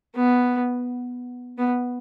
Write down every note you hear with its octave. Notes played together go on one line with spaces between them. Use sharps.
B3
B3